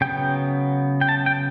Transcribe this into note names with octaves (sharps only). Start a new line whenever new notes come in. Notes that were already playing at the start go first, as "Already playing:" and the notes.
C#3 F#3 B3 G5
G5
A5
G5